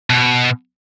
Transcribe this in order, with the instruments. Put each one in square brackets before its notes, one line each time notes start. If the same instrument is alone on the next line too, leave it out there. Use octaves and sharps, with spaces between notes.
[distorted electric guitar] B2